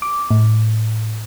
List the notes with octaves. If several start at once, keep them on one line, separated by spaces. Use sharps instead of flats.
D6
A2